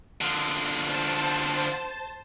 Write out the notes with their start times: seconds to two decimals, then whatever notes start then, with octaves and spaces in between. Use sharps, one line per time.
0.21 D3 F3
0.86 C5 A5